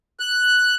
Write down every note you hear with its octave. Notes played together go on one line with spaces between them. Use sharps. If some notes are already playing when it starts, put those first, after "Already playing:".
F#6